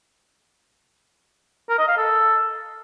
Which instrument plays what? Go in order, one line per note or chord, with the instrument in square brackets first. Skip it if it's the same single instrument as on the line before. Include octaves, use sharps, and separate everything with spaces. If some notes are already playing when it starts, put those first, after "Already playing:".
[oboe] A#4
D#5
F5
A4